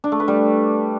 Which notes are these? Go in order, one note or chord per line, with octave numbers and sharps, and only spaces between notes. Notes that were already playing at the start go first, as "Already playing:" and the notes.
D4
A3
B4
G3